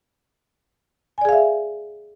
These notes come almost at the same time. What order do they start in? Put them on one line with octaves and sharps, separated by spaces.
G#5 D5 G#4 F5 E5